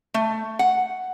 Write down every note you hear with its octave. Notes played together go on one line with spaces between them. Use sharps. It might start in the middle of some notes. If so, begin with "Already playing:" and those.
A3
F#5